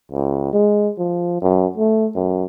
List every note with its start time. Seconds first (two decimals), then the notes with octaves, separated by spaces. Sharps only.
0.12 C#2
0.53 G#3
0.98 F3
1.41 F#2
1.78 A3
2.15 F#2